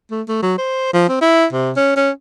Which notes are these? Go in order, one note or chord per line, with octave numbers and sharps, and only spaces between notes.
A3
A3
F#3
C5
F3
C4
E4
C3
C#4
C#4